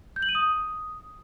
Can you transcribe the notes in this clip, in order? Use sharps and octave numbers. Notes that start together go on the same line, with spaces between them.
G6
F#7
D#7
D#6